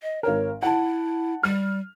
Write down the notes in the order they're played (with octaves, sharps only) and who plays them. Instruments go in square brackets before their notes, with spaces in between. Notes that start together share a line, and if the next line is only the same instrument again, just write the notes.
[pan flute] D#5
[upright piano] G#1 A#4 [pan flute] C#5
[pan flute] E4 [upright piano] F#5 A5
[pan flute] G3 [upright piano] F6